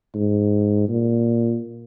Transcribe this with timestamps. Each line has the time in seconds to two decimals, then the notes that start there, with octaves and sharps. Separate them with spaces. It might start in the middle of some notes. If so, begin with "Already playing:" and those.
0.15 G#2
0.89 A#2